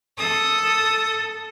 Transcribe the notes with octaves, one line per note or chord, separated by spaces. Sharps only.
A4 D#6